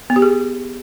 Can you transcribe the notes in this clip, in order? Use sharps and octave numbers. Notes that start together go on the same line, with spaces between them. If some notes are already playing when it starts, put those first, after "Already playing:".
B3
G4
G#4